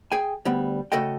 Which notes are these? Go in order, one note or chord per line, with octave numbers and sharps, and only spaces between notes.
G#4 G5 G#5
D2 G3 B3
C#3 A3 F#4 A4 D#5 G5